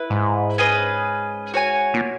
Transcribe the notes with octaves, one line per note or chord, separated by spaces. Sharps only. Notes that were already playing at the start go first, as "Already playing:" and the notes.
Already playing: E4 B4
G#2
C#4 G#4 B4 D#5
F#4 C#5 G#5
A#2